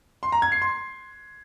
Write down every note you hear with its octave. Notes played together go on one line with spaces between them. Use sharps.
C6
A#5
G#6
C7
C6